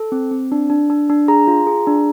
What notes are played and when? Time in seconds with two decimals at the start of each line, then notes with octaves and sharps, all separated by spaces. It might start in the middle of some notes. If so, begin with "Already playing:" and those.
Already playing: A4
0.12 C4
0.31 C4
0.52 D4
0.70 D4
0.90 D4
1.10 D4
1.28 G#4 A#5
1.47 F4
1.67 G#4
1.87 D4